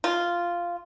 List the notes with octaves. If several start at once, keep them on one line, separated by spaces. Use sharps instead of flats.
F4